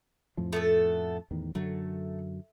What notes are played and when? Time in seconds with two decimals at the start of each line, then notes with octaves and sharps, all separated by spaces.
0.37 F2 A2 F3
0.53 A3 B3 A4
1.31 E2 A2 D#3
1.55 F#2 D3 F#3 A3